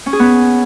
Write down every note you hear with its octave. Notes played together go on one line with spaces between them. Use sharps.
C#4
G#4
B3